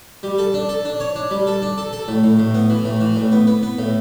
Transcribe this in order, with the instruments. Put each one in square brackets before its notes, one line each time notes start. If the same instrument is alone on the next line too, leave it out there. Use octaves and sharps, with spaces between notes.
[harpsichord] G3
A4
D4
A4
D4
C#5
D4
G3
A4
D4
A4
A4
A2
A2
A2
B3
E3
A2
E3
A2
B3
B3
B3
A2